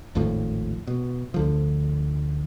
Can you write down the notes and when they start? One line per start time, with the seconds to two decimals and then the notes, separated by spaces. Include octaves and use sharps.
0.15 G#1 D#2 A2 F3
0.87 B2
1.34 D2 D3 F3